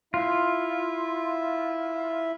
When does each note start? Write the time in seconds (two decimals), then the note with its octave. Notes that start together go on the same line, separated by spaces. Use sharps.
0.14 E4 F4 E5